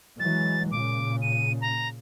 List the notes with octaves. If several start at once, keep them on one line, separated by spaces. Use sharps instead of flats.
E3 F#3 G#3 A6
A#2 C#3 D6
D#7
A#5